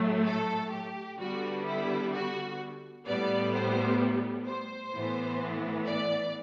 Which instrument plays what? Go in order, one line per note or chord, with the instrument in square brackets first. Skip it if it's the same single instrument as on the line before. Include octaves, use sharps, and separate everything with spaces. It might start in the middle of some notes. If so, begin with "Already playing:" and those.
Already playing: [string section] A2 F#3 A3
A4
G4
D3 G3 B3 F#4
E4
F#4
A2 G3 B3 D5
C5
C5
A2 E3 B3
D5